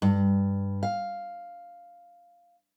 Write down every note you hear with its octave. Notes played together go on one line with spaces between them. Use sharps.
G2
F5